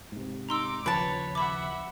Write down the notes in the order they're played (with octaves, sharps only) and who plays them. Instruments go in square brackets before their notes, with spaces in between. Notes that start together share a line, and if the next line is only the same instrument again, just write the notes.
[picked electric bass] G#2 C3
[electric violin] D#4 D6 [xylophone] A#5 C6 E6
[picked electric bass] D#2 C#3 F3 [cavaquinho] B4 A5 [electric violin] C#5
[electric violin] E5 F#5 [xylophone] B5 D6